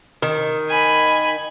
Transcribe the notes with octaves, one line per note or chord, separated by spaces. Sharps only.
D#3
G#5 B5